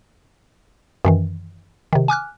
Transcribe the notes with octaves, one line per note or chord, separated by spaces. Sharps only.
F#2 D#3 E3
C3 D#3
G#5 D6 F6 F#6